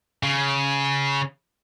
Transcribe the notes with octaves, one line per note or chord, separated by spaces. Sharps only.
C#3